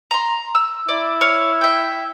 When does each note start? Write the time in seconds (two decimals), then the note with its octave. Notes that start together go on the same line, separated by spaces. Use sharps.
0.11 A#5 C6
0.55 E6
0.89 E4 D5
1.21 C#5 F5
1.61 E5 G5